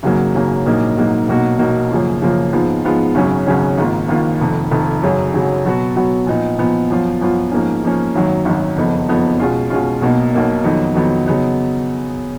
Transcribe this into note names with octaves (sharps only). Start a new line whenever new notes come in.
G#1 F#2 C#3 F#3 A#3
G#1 F#2 C#3 F#3 A#3
A#1 G#2 F#3 A#3 D#4
A#1 G#2 F#3 A#3 D#4
B1 B2 A#3 D#4 F#4
B1 B2 A#3 D#4 F#4
F#2 C#3 F3 A#3 F4
F#2 C#3 F3 A#3 F4
G#2 F3 G#3 B3 F4
G#2 F3 G#3 B3 F4
G#1 F#2 C#3 F#3 C#4
G#1 F#2 C#3 F#3 C#4
G#1 G#2 D#3 A#3 F4
G#1 G#2 D#3 A#3 F4
F1 F2 D#3
F1 F2 D#3
G#1 F#2 C#3 F#3
G#1 F#2 C#3 F#3
B2 F#3 B3 F#4
B2 F#3 B3 F#4
A#2 F3 B3 D#4
A#2 F3 B3 D#4
F#2 F3 B3 F4
F#2 F3 B3 F4
G#2 F3 A#3 C#4
G#2 F3 A#3 C#4
G#1 F#2 D#3 F#3
G#1 F#2 D#3 F#3
F#1 F2 F3 B3 D#4
F#1 F2 F3 B3 D#4
B2 G#3 C#4 F4
B2 G#3 C#4 F4
B1 B2 A#3 D#4
B1 B2 A#3 D#4
F2 D#3 F#3 B3 D#4
F2 D#3 F#3 B3 D#4
C#3 F#3 B3 D#4